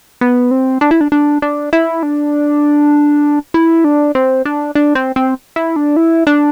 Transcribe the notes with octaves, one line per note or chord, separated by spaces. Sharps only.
B3
C4
D4
E4
D4
D4
D4
E4
D4
E4
D4
C4
D4
D4
C4
C4
E4
D4
E4
D4